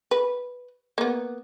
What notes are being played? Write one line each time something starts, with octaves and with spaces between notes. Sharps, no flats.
B4
A#3 B3